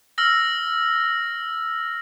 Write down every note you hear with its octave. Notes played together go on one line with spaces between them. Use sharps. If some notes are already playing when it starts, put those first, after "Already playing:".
E6 F6 A#6